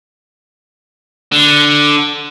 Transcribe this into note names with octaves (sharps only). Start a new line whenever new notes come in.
D3